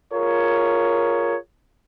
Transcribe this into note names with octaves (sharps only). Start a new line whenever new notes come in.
F4 G#4 A#4 C#5